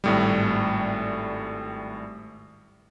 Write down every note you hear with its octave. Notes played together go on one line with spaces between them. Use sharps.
G#1 A2 G3